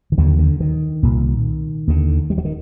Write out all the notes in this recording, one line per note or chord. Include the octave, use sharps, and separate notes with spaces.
D#3
D#2 D3 F#3
D3
D#3
C2 A#2
D#2 D3
G3
F#3
D#3